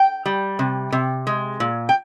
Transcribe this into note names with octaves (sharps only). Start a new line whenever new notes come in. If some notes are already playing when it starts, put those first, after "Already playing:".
Already playing: G5
G3
C3
C3
G#3
A#2
G5